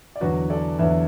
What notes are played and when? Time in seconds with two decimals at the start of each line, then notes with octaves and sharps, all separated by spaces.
0.16 D5
0.21 E2 D3 F#3 F#4 B4
0.50 A4 D5
0.79 E2 D3 F#3 B4 E5